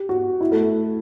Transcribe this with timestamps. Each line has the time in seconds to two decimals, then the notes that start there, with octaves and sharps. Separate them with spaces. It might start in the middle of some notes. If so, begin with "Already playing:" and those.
Already playing: G4
0.09 F#4
0.41 E4
0.52 A3
0.62 A3